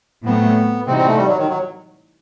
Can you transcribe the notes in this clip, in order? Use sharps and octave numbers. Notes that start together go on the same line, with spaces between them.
A2 F#3 A3 B3 C4
C3 E3 G3 C4 D#4 F#4
C4
A3
G3
F#3
D#3
F#3